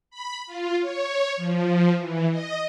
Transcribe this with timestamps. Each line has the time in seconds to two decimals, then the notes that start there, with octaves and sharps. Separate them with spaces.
0.11 B5
0.47 F4
0.81 C#5
1.37 F3
1.98 E3
2.30 D#5